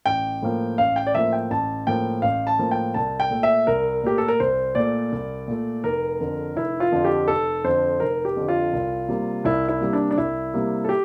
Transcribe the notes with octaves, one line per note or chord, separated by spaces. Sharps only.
A1 G5
A2 F3 A#3
A1 F5
G5
D5
A2 F3 A#3 E5
G5
A1 A5
A2 F3 A#3 G5
A1 F5
A5
A2 F3 A#3
G5
C2 A5
G5
A#2 A3
E5
C2 A#4
A#2 A3 G4
A4
A#4
C2 C5
A#2 A3 D5
C2
A#2 A3
F1 A#4
F2 D3
F1 E4
F4
F2 D3
G4
F1 A4
F2 D3 C5
F1 A#4
G4
F2 D3
F4
C2
C3 G3 A#3
C2 E4
E4
C3 G3 A#3
D4
D4
C2 E4
C3 G3 A#3
A4
G4